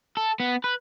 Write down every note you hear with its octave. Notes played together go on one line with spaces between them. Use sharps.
A4
B3
B4